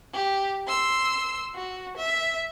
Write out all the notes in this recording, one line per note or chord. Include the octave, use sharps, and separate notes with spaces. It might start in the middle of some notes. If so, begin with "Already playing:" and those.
G4
C6 E6
F#4
E5